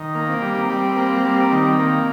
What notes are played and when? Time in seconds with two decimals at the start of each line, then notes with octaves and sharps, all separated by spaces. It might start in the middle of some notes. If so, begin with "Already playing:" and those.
Already playing: D#3
0.15 A#3
0.28 C4
0.41 G3
0.70 G3
0.96 A#3
1.25 G3
1.52 D#3
1.79 A#3